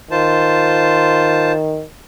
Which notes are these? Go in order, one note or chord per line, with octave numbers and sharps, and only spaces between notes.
D#3 F4 C5 A5